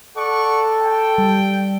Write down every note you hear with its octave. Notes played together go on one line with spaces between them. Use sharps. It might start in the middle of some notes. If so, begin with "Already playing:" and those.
A4 D5 F#5 C#6
G5
G3